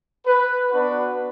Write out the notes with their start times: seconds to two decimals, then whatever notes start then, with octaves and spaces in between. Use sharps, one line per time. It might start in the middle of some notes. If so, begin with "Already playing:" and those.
0.26 B4
0.71 B3 D4 F#4 B4